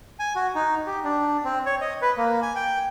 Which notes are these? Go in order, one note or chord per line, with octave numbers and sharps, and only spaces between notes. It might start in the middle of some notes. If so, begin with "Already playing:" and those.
G#5
F#4
D#4
G4
D4
C4
C#5
D#5
B4
A#3
G#5
G5